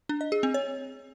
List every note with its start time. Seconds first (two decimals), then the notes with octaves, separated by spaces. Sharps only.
0.09 D4
0.21 D#5
0.32 G#4
0.43 C4
0.54 C#5